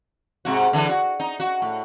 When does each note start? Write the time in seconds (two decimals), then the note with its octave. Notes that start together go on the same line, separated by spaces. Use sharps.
0.45 G#2 C3 F#4
0.73 D3 E3 D4
0.89 F#4
1.20 D#4
1.40 F#4
1.62 A2